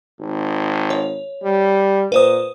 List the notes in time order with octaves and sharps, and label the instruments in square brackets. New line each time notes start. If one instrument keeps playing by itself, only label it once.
[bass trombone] G#1
[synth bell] C#5
[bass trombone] G3
[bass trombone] A#2 [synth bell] B4 C5 D#6